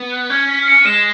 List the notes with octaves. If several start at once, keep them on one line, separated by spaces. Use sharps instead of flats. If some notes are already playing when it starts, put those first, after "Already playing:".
Already playing: B3
F#6
C#4 G#6
B6
C#7
G#3 E7